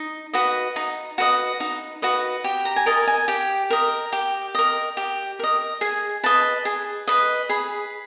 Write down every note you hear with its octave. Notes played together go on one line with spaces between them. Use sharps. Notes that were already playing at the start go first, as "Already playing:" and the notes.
Already playing: D#4
F#4 B4 D#5
D#4
F#4 B4 D#5
D#4
F#4 B4 D#5
G4 G5
A#5
G#5
A#4 D#5 A5
G#5
G4 G5
A#4 D#5
G4
A#4 D#5
G4
A#4 D#5
G#4 G#5
B4 D#5 A5
G#4
B4 D#5
G#4 B5